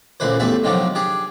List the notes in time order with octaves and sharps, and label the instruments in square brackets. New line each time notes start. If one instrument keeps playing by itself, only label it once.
[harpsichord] C#2 A#2 D3 B4 C5
A1 E2 G3 A3 E5 A5
G#2 C3 D#3 F3 F#3 D4
D4 G4 G#4